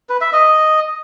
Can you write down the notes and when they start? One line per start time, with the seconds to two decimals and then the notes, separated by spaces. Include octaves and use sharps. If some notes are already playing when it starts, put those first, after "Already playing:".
0.09 B4
0.21 E5
0.33 D#5